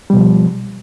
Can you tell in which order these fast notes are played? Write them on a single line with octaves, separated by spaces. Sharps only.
G3 B2 F3